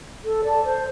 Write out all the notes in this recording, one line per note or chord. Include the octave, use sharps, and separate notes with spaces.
A4
D5 A5
C5